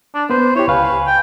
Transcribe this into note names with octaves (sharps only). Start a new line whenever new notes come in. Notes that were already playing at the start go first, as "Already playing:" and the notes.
D4
B3 B4 C5
E4 G4 C#5
C#2 B4 F5 G#5
G5